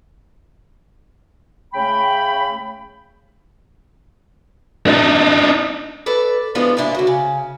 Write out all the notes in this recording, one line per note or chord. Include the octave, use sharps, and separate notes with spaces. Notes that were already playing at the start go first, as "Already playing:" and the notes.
C#3 A3 G5 B5
D4 D#4
A4 B4 D5
E3 F3 G#3 B3 D4 F4
G#2 A#3 D4 E4 F4
D3 F#3
C#3